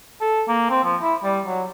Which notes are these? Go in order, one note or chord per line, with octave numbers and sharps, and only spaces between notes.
A4
A#3
C4
F3
E4
G3
F#3